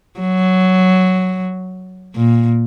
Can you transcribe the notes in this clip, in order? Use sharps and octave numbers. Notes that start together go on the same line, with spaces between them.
F#3
A#2